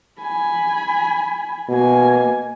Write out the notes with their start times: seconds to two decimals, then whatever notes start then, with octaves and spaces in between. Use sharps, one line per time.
0.21 G#5 B5
1.69 B2 A#3 G#5